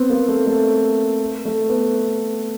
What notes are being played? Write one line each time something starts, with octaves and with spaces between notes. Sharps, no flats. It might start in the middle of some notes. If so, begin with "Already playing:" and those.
Already playing: B3 C4
A#3
A3
A3
A3
B3